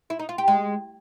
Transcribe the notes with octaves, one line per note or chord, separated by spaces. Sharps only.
E4
D#4
F4
G4
G#3